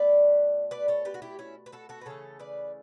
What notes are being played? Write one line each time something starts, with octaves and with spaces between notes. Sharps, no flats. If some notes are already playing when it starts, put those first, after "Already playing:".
Already playing: B2 A3 B4 D5
B4 D5
A4 C#5
G4 B4
F#4
E4 G4
C#4 E4
B4
F#4 A4
F#4 A4
B4
C#3 E3 A3 A4 C#5
B4 D5